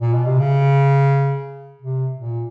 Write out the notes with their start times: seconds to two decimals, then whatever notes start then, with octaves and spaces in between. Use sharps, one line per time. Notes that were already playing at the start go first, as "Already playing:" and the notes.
0.01 A#2
0.14 B2
0.26 C3
0.39 C#3
1.82 C3
2.18 A#2